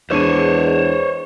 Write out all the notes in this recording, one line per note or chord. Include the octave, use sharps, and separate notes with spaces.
E2 G#3 D4 C5 C#5 D#7